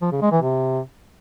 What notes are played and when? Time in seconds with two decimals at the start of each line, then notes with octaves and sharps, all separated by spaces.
0.02 F3
0.12 C#3
0.22 G#3
0.32 E3
0.42 C3